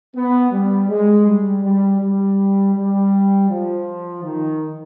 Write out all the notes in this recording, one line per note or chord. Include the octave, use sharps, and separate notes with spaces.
B3
G3
G#3
G3
G3
G3
G3
F3
D#3